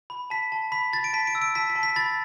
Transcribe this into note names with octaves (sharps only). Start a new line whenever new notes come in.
B5
A5 B6
A5
B5 B6
B5 A6
D7
A5 B6
D7
E6
D7
A5 B6
B6
A5
B6
B5 A6